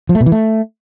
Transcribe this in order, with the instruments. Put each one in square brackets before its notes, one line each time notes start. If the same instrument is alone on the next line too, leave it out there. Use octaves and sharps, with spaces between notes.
[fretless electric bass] F3
A3
B2
E3
A3